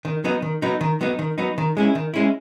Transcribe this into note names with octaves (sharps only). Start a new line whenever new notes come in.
D#3
F#3 B3 D#4
D#3
F#3 B3 D#4
D#3
F#3 B3 D#4
D#3
F#3 B3 D#4
D#3
G#3 C#4 E4
D#3
G#3 C#4 E4